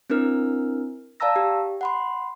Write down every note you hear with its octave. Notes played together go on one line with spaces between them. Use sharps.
C4 D4 E4 A#4 F6
D5 F5 A5 A#5 E6 A#6
G4
F#5 B5 C6